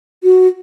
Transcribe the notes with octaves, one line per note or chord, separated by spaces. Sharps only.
F#4